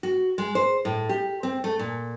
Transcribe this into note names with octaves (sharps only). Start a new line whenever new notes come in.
F#4
G#3
C5
A2
G4
C4
A3
A#2